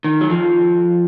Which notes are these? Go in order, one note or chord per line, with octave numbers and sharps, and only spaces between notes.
D#3
F#3
F2 F3